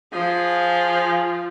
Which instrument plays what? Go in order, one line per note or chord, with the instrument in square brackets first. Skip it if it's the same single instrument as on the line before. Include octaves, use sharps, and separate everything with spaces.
[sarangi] F3 [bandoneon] G#4 G#5